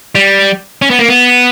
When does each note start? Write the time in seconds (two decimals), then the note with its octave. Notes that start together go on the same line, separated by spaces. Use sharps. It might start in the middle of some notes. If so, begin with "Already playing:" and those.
0.15 G3
0.82 C#4
0.90 B3
0.99 A#3
1.09 B3